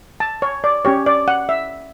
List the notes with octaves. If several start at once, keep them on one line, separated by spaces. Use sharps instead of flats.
A5
C#5
D5
C#4 G4 C#5
D5
F#5
E5